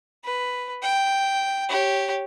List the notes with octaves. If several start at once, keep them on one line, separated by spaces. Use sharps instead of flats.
B4
G5
G4 C#5